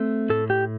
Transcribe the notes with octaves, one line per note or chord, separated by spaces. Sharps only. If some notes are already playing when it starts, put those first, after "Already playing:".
Already playing: A3 C4
A2 A4
G4